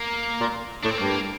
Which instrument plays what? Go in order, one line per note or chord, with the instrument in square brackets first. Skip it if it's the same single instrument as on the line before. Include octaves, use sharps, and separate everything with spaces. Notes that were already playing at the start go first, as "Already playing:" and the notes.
Already playing: [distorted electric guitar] A#3
[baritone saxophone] A#2
[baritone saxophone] A2 [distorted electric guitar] D4
[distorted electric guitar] C4
[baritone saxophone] G2 [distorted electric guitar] A#3